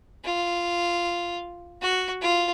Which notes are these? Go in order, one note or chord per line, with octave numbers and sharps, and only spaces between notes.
F4
F#4
F4